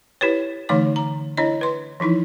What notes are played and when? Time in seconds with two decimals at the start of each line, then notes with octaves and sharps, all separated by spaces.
0.21 E4 G4 B4 C#5
0.69 D3 E3 A3 D#4 C#5 D6
0.96 A#5
1.37 D4 E4 C#5 D#5
1.61 B4 C6
2.00 E3 F3 D#4 E4